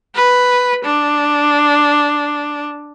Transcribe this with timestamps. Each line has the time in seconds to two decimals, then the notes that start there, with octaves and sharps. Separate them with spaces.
0.15 B4
0.85 D4